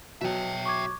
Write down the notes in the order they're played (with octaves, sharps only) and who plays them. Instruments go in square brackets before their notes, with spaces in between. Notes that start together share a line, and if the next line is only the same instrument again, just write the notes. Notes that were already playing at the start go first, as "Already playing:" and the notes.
[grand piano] B2 F#3 [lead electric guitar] E5 G5
[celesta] C#6 D6 G#6